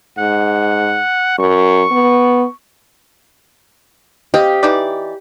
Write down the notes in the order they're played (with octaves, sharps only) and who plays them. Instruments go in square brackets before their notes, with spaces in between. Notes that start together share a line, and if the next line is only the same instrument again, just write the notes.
[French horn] G#2 [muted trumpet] F#5
[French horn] F#2 [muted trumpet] C#6
[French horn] B3
[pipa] C4 D#5 F5 [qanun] G4
[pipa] E3 D#4 D5